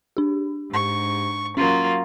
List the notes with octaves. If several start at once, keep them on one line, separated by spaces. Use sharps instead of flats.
D4 G4
G#2 C#6
F#3 A#3 C#4 F4